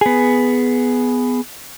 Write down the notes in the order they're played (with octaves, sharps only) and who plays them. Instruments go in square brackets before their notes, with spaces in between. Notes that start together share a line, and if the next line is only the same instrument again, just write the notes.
[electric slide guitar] B3 G#4